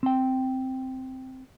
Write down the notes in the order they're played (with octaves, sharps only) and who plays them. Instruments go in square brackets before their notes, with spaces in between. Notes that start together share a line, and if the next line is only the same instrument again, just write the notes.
[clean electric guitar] C4 G5